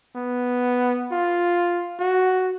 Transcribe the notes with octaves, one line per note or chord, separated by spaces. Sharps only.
B3
F4
F#4